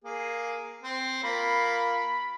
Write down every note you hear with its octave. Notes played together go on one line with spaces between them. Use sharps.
A#3 G#4
C4 C5
A#3 F4 B5